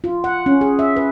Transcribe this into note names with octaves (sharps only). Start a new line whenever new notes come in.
F4
F#5
C#4
G#4
E5
B4